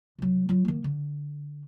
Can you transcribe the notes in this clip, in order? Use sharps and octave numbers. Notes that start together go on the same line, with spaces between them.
C2 F#3
F#3 F4
D#3 A#3
D3